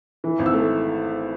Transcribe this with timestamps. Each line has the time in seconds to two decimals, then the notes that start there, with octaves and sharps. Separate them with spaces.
0.24 E3
0.39 G#1
0.46 E6
0.54 A3